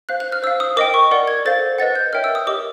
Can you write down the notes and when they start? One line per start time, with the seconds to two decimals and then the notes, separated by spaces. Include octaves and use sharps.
0.09 C5 F5 F#6
0.20 F#6
0.32 F6
0.43 C5 F5 E6
0.60 D#6
0.77 A#4 D#5 G5 D6
0.94 C#6
1.11 A#4 D5 F#5
1.27 G#6
1.45 A4 C5 F5 A6
1.78 B4 D#5 F#5 A6
1.95 G6
2.13 A#4 C#5 E5 G5 F6
2.24 E6
2.35 D#6
2.47 G4 A#4 D#5 D6